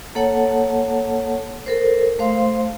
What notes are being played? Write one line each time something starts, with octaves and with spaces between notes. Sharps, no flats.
A#3 A4 C#5 F#5 A5
A4 A#4 C5
A3 C5 F5 C6